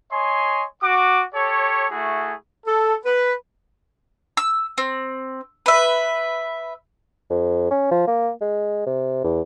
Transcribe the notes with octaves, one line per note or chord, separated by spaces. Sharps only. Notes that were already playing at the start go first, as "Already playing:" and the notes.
C#5 D#5 G#5 C6
F#4 D6
G4 A4 C#5
A3 E4 F#4 G#4
A4
B4
E6
C4
B4 E5
F2
C#4
F3
A#3
G#3
C3
E2